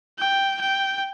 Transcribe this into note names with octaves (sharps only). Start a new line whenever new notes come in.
G5
G5